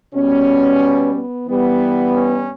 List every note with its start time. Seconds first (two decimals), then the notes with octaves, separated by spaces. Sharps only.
0.13 B2 G3 B3 C#4
1.14 B3
1.48 G2 E3 G3 B3
2.14 C#4